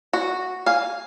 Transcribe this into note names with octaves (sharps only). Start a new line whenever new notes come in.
F#4
F5 G#5